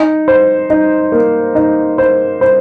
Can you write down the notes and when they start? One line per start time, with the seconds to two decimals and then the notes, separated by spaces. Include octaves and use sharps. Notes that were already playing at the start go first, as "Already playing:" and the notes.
Already playing: D#4
0.28 C5
0.70 D#4
1.12 A#3
1.55 D#4
1.98 C5
2.41 C5